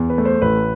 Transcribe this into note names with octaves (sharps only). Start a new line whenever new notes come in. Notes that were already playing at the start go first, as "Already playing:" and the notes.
Already playing: E2
B4
A3
C5
A1 B4